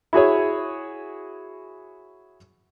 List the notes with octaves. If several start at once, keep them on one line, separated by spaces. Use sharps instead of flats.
E4 F#4 G#4 C#5